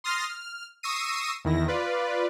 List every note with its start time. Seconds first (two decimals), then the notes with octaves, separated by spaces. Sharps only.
0.04 C6 D#6 F6 A6 A#6 C7
0.30 F6
0.83 C#6 D#6 E6 A#6 C7 D#7
1.45 E2 D#3 E4 A#6
1.68 F4 B4 D5